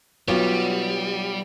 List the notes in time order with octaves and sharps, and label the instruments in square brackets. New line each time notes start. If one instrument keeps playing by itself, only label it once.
[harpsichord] B1 [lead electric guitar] G3 [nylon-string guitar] B3 F4 C#5